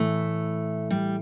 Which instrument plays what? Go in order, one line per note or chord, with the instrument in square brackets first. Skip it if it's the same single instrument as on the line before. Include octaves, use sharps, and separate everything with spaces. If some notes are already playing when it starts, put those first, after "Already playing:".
Already playing: [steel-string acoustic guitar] A2 E3 A3
G3